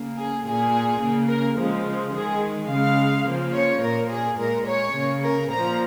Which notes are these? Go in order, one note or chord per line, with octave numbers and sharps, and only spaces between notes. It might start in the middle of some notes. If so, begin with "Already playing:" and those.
Already playing: C#3 A#3
G#4
A#2 A#3 G#4
C#3 A#3
A#4
C#3 F3 G#3
D#3 G#3 G#4
C#3 G#3 F5
C#3 F3 A#3
C#5
A#2 A#3 A#4
G#4
A#2 G#3 A#4
C#5
C#3 A#3
A#4
A#2 F3 A#3 A#5